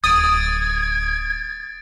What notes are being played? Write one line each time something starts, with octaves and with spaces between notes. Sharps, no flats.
D1 D#6 G#6 A6 D7